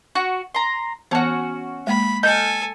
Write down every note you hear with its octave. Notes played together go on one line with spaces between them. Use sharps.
F#4
A#5 C6
E3 B3 C#4 F#4 A5
G#3 A#3 B5
A4 D#5 G#5 F6 G6